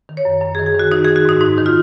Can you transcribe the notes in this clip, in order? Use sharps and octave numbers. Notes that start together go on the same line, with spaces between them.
D#3
C#5
F#2
F#2
G#4
D#3
G#4
D#3
F#4
D#3 D#4
D#3 G#4
F#4
G#2 D#4
G#2 D#4
D#3
F4